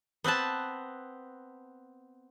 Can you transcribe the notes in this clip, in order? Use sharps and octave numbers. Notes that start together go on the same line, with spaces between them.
B3 C4 B4 A5